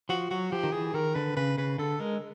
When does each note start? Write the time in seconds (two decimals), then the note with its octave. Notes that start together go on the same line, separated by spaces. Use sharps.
0.09 F3 F#4
0.31 F#3 F#4
0.52 F3 G4
0.63 D#3
0.72 E3 G#4
0.94 D#3 A#4
1.15 D3 B4
1.37 C#3 B4
1.58 C#3 B4
1.78 D3 A4
2.00 G#3 A#4